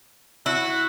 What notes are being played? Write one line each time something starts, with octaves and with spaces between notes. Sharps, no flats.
E4 F#4